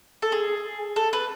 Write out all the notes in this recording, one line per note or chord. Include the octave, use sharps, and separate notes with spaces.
A4
G#4
A4
B4